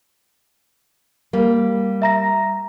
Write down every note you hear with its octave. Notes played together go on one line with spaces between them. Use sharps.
G3 A#3
E5 A#5 A#6